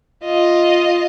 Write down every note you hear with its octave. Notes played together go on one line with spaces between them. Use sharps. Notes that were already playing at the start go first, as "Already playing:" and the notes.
F4 D#5